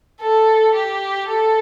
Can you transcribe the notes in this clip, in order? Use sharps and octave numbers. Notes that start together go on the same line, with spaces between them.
A4
G4
A4